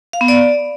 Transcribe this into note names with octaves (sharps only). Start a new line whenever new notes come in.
F5
B3
D5